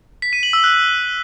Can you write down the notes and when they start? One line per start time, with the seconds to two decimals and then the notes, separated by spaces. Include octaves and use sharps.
0.22 B6
0.33 D#7
0.43 F#7
0.53 E6
0.64 F#6